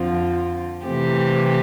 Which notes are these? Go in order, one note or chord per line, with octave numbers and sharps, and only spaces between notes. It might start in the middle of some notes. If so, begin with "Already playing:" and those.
Already playing: F2 D3 F3 C4 F4
C3 E3 A3 C4 G4